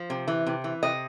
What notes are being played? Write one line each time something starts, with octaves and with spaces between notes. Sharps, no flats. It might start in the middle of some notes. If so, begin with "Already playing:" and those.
Already playing: F3
C3
E3
C3
E3
C3 D#5